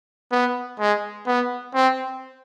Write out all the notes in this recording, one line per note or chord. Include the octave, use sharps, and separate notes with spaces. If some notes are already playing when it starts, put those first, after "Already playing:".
B3
G#3
B3
C4